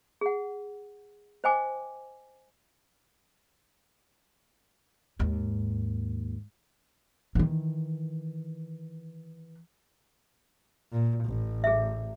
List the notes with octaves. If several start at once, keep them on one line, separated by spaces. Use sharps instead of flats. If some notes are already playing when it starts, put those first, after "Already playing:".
G#4 F#5
C5 D#5 G5 G#5 D6
D#2 G#2
D#3 E3
A#2
A1
G#4 E5